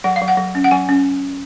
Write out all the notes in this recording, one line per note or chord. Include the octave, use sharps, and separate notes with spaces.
F#3 F#5
F5
F#3
F#5
F#3
C#4
F#5
F#3 G#5
C#4